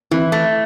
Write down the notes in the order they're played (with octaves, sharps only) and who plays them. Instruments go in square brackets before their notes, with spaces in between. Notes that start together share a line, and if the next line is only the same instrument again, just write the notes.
[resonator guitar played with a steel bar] E3 [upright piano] C4 E4
[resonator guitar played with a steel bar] A3